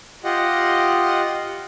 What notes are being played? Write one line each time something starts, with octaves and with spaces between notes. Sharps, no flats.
F4 G4 D#5 F#5